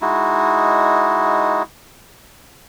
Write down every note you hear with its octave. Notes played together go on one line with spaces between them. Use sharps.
G#3 D#4 E4 F#4